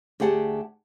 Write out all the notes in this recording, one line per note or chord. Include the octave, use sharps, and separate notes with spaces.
D2 G4 G#4 F#5 A5